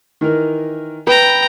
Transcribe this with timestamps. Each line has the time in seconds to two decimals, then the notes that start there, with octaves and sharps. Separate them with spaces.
0.21 D#3 E3 A#4
1.07 B4 G5 A#5